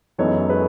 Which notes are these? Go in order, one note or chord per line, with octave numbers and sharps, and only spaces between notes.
F#2 E3 G#3 B3 D#4 A4 C#5
G#4 B4